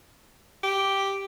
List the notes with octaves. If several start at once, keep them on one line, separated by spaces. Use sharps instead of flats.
G4